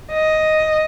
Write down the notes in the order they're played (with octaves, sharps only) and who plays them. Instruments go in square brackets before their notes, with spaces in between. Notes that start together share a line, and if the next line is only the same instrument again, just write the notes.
[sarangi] D#5